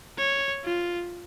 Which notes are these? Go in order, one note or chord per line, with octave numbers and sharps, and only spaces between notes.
C#5
F4